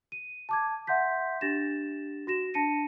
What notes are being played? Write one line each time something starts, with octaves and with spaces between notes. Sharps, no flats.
D#7
A5 D6 G#6
E5 F#5 C6 G6 B6
D4 G4 A6 A#6 E7
F#4 A#6 E7
D4 A5 A#6 C#7 D#7